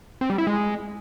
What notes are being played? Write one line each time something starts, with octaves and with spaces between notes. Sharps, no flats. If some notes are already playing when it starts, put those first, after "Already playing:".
C4
G3
E4
G#3